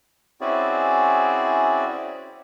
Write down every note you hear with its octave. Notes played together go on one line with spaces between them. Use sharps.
C4 C#4 E4 F#4 G#4 D5